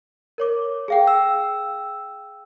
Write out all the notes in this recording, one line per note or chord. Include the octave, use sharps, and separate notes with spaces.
A#4 C#5 D6
G#4 F5 G5
E6